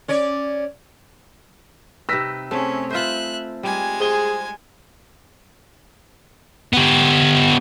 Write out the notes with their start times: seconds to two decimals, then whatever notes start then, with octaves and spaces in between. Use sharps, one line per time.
0.08 C#4 C#5 D5
2.09 C3 D#4 B4 E6 A#6 B6
2.51 A3 C4 C#4 G#4
2.90 F4 B4 C5 E5 F#6
3.63 G3 G#3 G#5
4.00 G#4 C5 G7
6.73 B3 G4